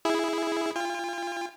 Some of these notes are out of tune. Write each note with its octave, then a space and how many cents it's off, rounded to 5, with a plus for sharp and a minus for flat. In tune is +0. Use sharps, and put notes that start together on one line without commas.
E4 +0 G#4 +0
F4 -20 G5 +45